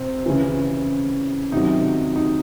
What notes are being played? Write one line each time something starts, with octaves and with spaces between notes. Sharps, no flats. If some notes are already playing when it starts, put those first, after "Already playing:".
Already playing: C3 C4
C#3 E3
C3 D#3 F#3 D#4
D#4